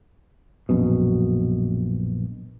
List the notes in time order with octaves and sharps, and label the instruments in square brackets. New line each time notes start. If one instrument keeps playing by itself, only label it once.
[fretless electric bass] A#1 F#2 B2